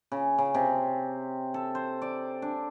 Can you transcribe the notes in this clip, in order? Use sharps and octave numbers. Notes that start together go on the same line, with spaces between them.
C#3
C#3
C3
A4
C5
D5
D4